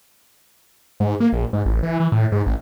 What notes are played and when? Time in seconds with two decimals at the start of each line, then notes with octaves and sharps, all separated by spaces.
1.00 G#2
1.20 A#3
1.33 A#1
1.53 G#2
1.65 A1
1.83 E3
2.00 E3
2.12 A2
2.32 G#2
2.46 A1